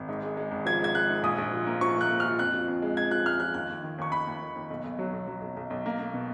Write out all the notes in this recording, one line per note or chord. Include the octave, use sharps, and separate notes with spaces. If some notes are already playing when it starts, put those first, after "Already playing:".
Already playing: G#1
G#2
G#3
G#3
G#1
F3 G#6
G#3 G#6
G#3 F#6
G#2
A#1 D#6
A#1
F3
A#3
F3 C#6
A#3
F#6
A#3
F6
F3
F2 F#6
F3
F2
G#3
G#3 G#6
F3 F#6
G#3 F6
F3 F#6
D#2 F#6
D#2
D#3
D#2 C#6
D#2 B5
D#2
D#2
D#2
B1
B1
F#3
B1
F#3
B1
B1
B1
A#3
A#3
B2